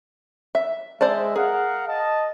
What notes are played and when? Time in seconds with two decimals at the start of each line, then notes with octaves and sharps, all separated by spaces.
0.55 E5
1.01 G#3 C5 D5 E5 A5
1.36 G#4 A#4 F5 F#5
1.88 D#5 A5